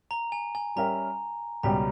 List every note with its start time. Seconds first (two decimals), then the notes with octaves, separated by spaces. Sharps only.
0.11 A#5
0.32 G#5
0.55 G#5
0.76 G3 C#4 G4 A#4 E5 A#5
1.63 C#2 B2 G3 C#4 G4 A#5